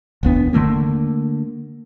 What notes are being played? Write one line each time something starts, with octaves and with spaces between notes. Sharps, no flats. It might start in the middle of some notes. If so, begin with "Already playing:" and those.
F1 D#2 B3 D4
D3 F3 A3 A#3